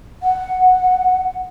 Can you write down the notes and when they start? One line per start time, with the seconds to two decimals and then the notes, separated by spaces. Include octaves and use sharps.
0.22 F#5